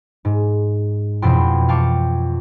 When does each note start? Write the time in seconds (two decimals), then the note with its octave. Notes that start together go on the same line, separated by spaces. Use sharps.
0.25 G#2
1.22 E1 F2 B2 E4 G5 C6
1.69 F5 G5 A5 C#6 D6